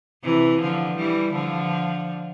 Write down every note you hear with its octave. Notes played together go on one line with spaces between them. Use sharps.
C3 E3
D3 F3
E3 G3
D3 F3